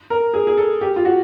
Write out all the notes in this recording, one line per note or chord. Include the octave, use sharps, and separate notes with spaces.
A#4
G#4
G#4
A4
G4
F4
F#4